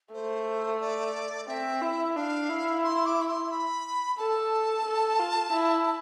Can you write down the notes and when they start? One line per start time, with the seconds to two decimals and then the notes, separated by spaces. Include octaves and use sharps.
0.13 A3 C5
0.81 D5
1.48 C4 E5
1.82 E4
2.16 D4 F5
2.50 E4
2.84 C6
3.06 D6
3.22 B5
3.28 C6
3.51 B5
4.18 A4 A5
4.86 A4
5.20 F4
5.53 E4